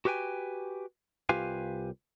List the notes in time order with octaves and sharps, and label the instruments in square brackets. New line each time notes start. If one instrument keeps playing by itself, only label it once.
[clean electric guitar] F#4 G4 B4 G5 G#5
C2 F4 G4 B4 F5 G#5